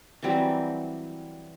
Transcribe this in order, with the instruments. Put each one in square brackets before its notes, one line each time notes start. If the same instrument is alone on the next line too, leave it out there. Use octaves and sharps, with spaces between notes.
[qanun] E3 F#3 G3 C4